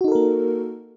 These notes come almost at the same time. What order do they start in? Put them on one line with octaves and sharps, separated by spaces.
F#4 D#4 A4 A#4 A#3